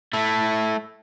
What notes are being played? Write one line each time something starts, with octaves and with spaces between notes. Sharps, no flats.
A3 E4